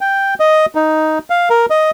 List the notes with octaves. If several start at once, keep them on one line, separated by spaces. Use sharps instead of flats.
G5
D#5
D#4
F5
A#4
D#5